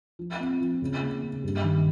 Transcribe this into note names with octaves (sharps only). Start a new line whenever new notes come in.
F3
C4
F3
C#3
A#3
C#3
G2
D#3